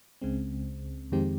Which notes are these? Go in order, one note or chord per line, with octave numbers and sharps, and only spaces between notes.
C#2 C#3 G#3 C4
F2 D#3 G#3 C4 G4